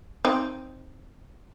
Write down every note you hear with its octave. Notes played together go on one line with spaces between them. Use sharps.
C4 D#4